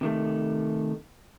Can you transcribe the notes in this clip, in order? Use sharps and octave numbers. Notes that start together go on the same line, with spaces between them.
C3 D#3 A3